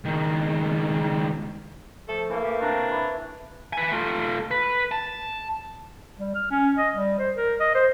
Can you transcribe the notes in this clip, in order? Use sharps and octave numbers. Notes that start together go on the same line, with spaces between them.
C#2 D#3
F3 A3 A4
E3 A3 A#3
G4
C3 D4 A#5 C#6
E4 B4 C#5
B4 G#5
A3 F4
B4
A5
G3
F6
C#4
D#5
G3
C5
A#4
D#5
C5